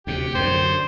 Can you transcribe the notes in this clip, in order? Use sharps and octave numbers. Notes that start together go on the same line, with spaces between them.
D2 C3 G4
F#2 D3 C5